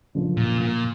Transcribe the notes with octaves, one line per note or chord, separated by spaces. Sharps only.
F#1 F#2 D3 F3
A#2
A#2